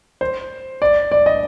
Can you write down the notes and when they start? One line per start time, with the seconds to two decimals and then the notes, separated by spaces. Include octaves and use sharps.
0.21 C5
0.82 D5
1.12 D5
1.26 D#5